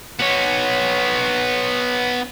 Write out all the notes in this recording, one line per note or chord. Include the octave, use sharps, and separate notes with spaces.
B3 C#5